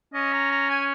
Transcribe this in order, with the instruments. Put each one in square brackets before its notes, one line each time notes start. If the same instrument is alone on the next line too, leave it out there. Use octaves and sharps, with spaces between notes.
[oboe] C#4 [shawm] D#5
[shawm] A#5
A#5
G#5